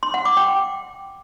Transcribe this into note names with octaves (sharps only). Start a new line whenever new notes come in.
C6
F#5
D6
G5